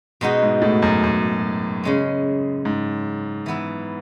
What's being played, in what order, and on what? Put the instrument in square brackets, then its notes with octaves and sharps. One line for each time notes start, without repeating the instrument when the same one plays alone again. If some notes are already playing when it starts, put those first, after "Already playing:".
[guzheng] B2 G#3 D#4 F#4
[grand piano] G#2
A2
F#2
F#2
[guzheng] C#3 G#3 C#4
[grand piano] G#2
[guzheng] E3 B3 E4